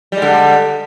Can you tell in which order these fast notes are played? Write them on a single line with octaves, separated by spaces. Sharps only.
G3 G#3 D3